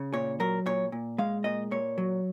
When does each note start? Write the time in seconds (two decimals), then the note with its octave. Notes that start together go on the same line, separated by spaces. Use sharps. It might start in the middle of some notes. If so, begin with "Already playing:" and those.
Already playing: C#3
0.13 A#2 C#5
0.40 F#3 A#4
0.66 A#2 C#5
0.92 A#2
1.18 G#3 F5
1.44 A#2 D#5
1.71 A#2 C#5
1.98 F#3